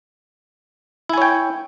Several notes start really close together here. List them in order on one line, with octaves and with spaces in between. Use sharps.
E4 G#5 C#5 G5